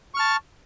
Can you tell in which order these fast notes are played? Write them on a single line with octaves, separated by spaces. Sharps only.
C#6 F6 A5